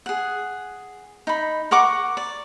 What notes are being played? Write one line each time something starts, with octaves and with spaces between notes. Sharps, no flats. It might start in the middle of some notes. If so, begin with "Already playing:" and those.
G#4 F#5
D#4 B5
A#4 F#5 C#6 D6
D5